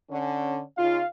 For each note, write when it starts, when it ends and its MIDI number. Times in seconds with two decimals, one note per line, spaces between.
0.10 0.61 50
0.10 0.61 61
0.77 1.00 49
0.77 1.00 63
0.77 1.00 65
0.77 1.08 77